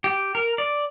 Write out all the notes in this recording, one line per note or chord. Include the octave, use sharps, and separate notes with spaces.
G4
A#4
D5